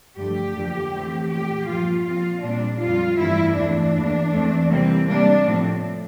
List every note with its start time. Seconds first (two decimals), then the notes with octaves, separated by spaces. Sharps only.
0.17 G2 D3 F3 A3 G4
0.55 F2 D3 F3 A#3
0.93 A2 E3 A3 C4
1.30 A#2 F3 A3 G4
1.68 G2 F3 A#3 F4
2.06 A#2 F3 C4 F4
2.43 A#2 G3 C4 D4
2.81 F2 D3 G3 C4 F4
3.19 G2 E3 A3 C4 E4
3.56 E2 E3 A3 C4 D4
3.94 E2 E3 A#3
4.32 E2 E3 A3 C4
4.70 C3 E3 G3 A#3 C4
5.07 C3 G3 A#3 D4
5.45 A2 F3 A3 C4